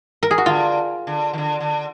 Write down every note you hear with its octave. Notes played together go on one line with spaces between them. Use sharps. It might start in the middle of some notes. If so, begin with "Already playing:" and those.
A#4
G#4
F#4
D3 F4
D3
D#3
D3
D3